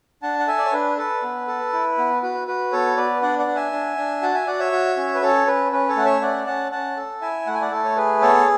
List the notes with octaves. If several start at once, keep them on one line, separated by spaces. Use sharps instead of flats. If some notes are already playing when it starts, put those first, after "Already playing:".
D4 F#5 A5
F#5
A4 E5 G#5
D5
C#5
D4 B4
A4 B4
B3
A4
E4
B3
F#4 B4
F#4 B4
B3 A4 C#5
B3 B4 D5
D4 D5 F#5
D5 F#5
D4
E5 G#5
D4
D4
F#4 F#5 A5
E5 G#5
F#4 D5 F#5
C#5 E5
F#4
C#4
B4
C#4 A4 C#5
C#4 B4
C#4 B4
A4 C#5
A3 F#5
C#5 E5
C#4 D5 F#5
C#4 F#5 A5
C#4 F#5 A5
A4
E4 E5 G#5
A3 F#5
G#5
D5 F#5
A3 A4
C#5
G#4 B4
B3 A4 C#5